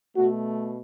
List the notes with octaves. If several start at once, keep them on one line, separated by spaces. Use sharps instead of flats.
B2 A3 F#4